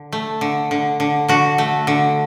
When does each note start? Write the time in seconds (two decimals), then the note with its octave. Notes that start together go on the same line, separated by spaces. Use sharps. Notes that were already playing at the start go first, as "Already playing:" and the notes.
Already playing: D3
0.12 A3
0.41 D3
0.71 D3
1.00 D3
1.28 D3 F#4
1.58 A3
1.87 D3